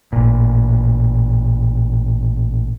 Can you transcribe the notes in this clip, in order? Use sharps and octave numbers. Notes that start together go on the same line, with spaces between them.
A1 A#2